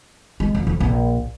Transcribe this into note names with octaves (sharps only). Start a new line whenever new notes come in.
G#3
F2
F2
A#1